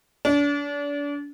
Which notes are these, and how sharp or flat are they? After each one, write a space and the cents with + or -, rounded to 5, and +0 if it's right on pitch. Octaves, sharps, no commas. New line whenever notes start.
D4 -35